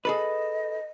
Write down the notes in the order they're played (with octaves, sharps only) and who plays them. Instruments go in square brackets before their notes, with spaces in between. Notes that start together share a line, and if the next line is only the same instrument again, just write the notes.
[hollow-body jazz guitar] G#4 A4 B4 [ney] D#5